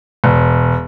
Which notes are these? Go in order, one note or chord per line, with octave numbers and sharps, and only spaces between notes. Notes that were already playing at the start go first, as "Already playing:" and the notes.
E1